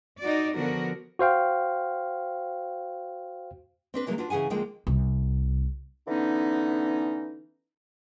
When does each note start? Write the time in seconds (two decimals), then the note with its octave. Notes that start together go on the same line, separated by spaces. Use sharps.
0.20 D#4 F#4 D5
0.56 D3 F3 B3 F#4 A#4
1.19 F#4 C5 F5 G5
3.94 C4 D4 B4
4.06 C#3 E3 F#3 G#3 A#3 D4
4.18 D4 F4 F#4 B4
4.30 C#3 E3 G#4 F#5 G#5
4.50 D#2 D3 F3 G#3 A#3 G5
4.87 C2
6.08 D3 E3 B3 C#4 D#4